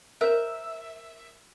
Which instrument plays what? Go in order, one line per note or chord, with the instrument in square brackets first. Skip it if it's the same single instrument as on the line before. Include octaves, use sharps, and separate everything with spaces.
[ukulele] A#4 C5 [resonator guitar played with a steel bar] E5